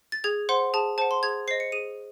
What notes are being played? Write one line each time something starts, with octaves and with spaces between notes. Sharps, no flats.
A6
G#4 G#6
C5 F#5 C6
G#4 A5
C5 F#5 A5
C6
G#4 G#6
C5 D#5 C7
C#7
G#4 D#7